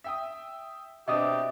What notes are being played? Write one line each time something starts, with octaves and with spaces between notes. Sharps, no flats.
E5 G5 D#6
B2 C4 D4 G4 D#5 E5 D#6